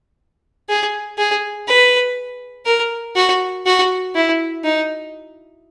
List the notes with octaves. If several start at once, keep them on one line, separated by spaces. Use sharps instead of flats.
G#4
G#4
B4
A#4
F#4
F#4
E4
D#4